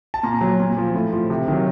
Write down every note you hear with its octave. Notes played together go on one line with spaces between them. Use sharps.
A5
A#2 A#5
F#3
A#2
F3
A2
F3
C3
D#3 F#3